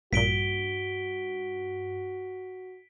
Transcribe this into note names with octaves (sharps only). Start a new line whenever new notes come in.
A#1 G2 A#2 F#4 B6 D7 G7